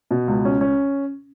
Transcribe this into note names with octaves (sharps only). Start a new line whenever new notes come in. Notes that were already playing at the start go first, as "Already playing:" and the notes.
B2
C#2
C#4
C#4